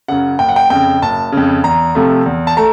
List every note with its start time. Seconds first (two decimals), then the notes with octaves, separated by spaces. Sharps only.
0.08 F#2 C#3 F#5
0.39 F#1 G5
0.49 F#5
0.56 G5
0.70 F2 C#3 G5
1.02 F#1 A5
1.32 F2 C#3
1.64 E2 A#5
1.95 C3 F3 A3
2.26 E2
2.47 A5
2.57 A3 A#5